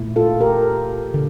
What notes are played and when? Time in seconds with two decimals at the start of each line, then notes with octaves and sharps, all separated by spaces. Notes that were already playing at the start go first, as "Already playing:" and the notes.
Already playing: A#2 A3 E4
0.16 F4 A4
0.41 G4 A#4
1.14 D3